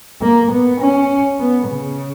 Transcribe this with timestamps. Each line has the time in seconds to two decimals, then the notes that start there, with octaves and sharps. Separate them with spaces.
0.21 A#3
0.51 B3
0.80 C#4
1.39 B3
1.68 C#3